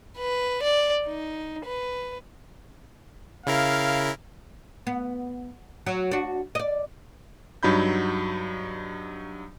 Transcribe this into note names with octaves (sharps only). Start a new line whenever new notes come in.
B4
D5
D#4
B4
C#3 E4 A#4 F5
B3
F#3
D4 F#4
D5 D#5
G2 F#3 D#4 B5 G6